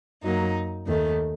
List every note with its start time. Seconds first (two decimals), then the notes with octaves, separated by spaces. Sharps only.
0.22 F#2 F#3 A#3 D#4
0.87 D#2 D#3 A3